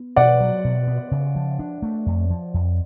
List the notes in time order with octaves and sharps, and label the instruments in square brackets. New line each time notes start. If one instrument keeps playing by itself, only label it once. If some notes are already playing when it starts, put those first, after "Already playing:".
Already playing: [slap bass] B3
[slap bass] B2 [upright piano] D5 F#5
[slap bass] F#3
B2
B3
C#3
F3
D4
A3
F2
F3
F2